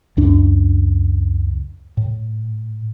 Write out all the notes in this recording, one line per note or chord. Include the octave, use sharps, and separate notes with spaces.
C#2 F#2 D4
A2